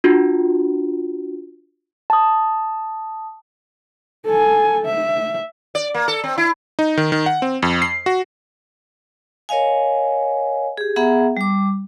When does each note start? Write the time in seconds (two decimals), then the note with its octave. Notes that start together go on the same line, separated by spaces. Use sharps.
0.04 D4 F4 F#4
2.10 A5 D#6
4.26 A4 G#5
4.85 E5
5.75 D5
5.94 A#3
6.08 A4
6.24 C4
6.38 E4
6.79 D#4
6.97 D#3
7.12 D#3
7.26 F#5
7.42 C4
7.62 F2
7.82 C7
8.06 F#4
9.49 A#4 C#5 D#5 F5 G#5
10.78 G4 G#4
10.96 B3 G#4 E5 F#5 A#5
11.37 G3 D6